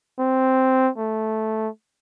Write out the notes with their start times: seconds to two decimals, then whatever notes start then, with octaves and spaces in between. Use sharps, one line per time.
0.19 C4
0.98 A3